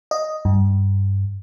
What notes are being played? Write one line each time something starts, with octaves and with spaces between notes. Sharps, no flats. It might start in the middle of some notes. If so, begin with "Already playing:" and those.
D#5
G2